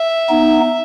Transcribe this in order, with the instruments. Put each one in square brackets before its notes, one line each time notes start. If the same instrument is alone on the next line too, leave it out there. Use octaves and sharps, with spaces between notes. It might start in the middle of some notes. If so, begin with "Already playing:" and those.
Already playing: [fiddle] E5
[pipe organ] B3 D#4